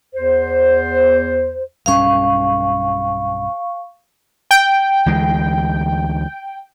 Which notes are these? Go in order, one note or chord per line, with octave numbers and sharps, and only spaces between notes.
E2 C5
B1 G2 C#4 F5 C#6
G5
D2 E3 G#3